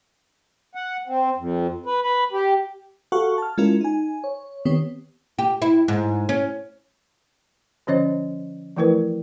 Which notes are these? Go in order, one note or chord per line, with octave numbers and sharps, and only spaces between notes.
F#5
C4
F2
B4
B4
G4
F#4 G4 A4 F5 F#5 C#6
A5 F6
G#3 C#4 E4 F4 A#4
D#4 G#5
C#5
D#3 B3 C4 G4 C#5
G4
E4
G#2
C#4
D3 F3 C#4 C5 C#5 D#5
E3 F3 A3 E4 A#4 B4